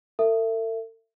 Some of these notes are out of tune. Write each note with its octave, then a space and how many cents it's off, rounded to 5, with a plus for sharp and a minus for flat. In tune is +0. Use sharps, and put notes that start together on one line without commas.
A4 +45 E5 +15